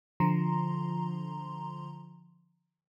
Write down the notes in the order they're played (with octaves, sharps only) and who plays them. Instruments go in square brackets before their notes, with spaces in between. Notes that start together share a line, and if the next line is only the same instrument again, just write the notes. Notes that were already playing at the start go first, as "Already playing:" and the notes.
[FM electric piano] D3 F3 A#5 C6